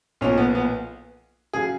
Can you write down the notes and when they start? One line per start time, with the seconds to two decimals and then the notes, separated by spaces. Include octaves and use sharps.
0.21 B1 A#2 F3 C#4
0.37 B3
0.55 B3
1.53 C#3 F#3 G#4